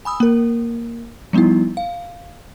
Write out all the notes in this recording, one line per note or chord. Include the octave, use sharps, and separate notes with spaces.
G#5 B5 D#6 E6
A#3 A#4
F3 G3 B3 D#4 E4
F5